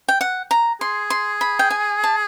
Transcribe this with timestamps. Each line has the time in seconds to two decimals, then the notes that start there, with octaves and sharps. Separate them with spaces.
0.08 G5
0.21 F#5
0.51 A#5
0.81 G#4 C6
1.10 C6
1.41 B5
1.59 G5
1.70 G#5
2.04 A5